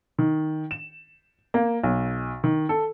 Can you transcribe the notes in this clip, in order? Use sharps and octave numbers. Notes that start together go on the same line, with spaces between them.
D#3
E7
A#3
B1
D#3
A4